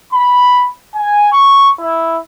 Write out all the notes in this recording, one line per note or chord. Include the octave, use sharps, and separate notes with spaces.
B5
G#5
C#6
E4